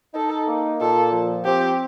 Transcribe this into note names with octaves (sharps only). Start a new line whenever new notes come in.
D#4 A4
A#3
A#2 A4
F3
C4 G4